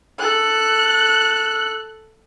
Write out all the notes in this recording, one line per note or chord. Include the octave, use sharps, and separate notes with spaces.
A4 F#6